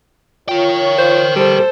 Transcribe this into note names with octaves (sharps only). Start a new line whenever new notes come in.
F4 A#4 C#5 G5
C5
G3 A4 C5